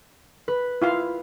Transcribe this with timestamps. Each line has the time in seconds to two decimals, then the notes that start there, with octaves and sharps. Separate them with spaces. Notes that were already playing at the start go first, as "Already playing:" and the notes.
0.48 B4
0.82 E4 F4 F5